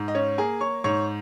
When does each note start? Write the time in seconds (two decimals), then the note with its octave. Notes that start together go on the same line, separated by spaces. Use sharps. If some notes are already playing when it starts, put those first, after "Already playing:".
Already playing: G#2
0.08 D#5
0.15 C#4 C#5
0.38 A#3 G#4 G#5
0.61 C#5 C#6
0.84 G#2 C#5 C#6